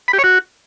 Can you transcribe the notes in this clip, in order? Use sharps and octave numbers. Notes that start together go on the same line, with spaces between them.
B5
G4
C#5
F#4